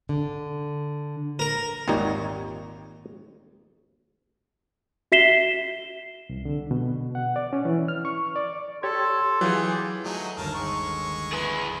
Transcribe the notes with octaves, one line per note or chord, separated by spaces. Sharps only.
D3
A#4
G#1 D#2 A#2 G3 D#4 C#5
F#4 E5 B6 C7 E7 G7
C2
D3
B2
F#5
D5
C#4
E3
F6
C#6
D5
G4 A4 C#5 C6 G#6
E3 F#3 F4 G4 G#4
F#3 A3 D#4 G#4
G1 D#2 A#4 A5
G#3 C#6
G#4 B4